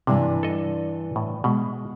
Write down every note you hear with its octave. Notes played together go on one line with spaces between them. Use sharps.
G2 C3 E3 D4
A4 D#5
A2
B2 G#3